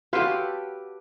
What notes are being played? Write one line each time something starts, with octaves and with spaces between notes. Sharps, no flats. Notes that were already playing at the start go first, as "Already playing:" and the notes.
F#4 G4 A4 B4 F5 C6